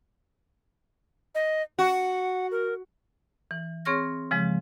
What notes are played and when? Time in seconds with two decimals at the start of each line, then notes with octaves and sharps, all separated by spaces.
1.35 D#5
1.79 F#4 F#5
2.51 A#4
3.51 E3
3.85 C4 G#4 C#5 C#6 F6 A#6
4.31 C#3 F3 G#3